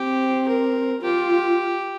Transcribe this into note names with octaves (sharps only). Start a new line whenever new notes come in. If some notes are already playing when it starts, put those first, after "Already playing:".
Already playing: C4 G4
A#4
F4 G4